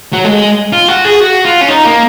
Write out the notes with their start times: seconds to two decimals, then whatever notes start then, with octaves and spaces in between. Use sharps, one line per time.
0.13 F#3
0.24 G#3
0.72 F4
0.88 F#4
1.05 G#4
1.20 F#4
1.45 F4
1.61 C#4
1.68 D#4
1.85 A#3